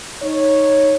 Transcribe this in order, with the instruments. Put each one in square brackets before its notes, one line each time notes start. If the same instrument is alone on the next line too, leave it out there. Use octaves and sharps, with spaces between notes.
[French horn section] D#4 C#5